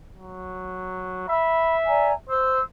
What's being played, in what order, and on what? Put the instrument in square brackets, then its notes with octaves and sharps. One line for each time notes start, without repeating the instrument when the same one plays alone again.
[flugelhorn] F#3
[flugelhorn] E5 [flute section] B5
[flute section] D5 G#5 A#5
[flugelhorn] C5 [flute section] E6